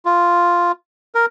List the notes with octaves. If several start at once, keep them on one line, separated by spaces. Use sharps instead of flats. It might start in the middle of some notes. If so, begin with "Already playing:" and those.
F4
A#4